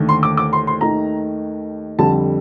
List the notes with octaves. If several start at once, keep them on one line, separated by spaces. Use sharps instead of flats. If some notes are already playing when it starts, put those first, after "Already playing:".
Already playing: D#2 D3 A3
C6
D6
D6
C6
C6
D#2 D#3 A3 A#5
F2 D3 G3 A5